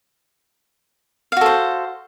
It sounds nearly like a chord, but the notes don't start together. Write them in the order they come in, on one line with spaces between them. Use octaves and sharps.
F5 F#4 A4 C5